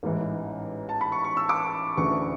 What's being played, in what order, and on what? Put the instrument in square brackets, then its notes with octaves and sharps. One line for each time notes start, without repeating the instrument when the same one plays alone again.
[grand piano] A1 G#2 E3
A5
B5
C#6
C#6
E6
D6
D2 C#3 E3 C#6